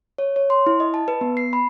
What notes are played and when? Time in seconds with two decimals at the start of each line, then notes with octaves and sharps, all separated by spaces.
0.18 C#5
0.36 C#5
0.50 C6
0.66 E4
0.80 D#5
0.94 A5
1.08 B4
1.21 B3
1.37 C7
1.53 B5